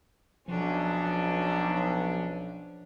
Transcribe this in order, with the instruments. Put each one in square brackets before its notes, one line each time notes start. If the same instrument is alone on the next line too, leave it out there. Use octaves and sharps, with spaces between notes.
[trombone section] B1 [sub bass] F3 [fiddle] C#4 D4